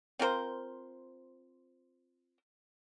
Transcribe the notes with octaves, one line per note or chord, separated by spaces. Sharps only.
C4 F4 A#4 C5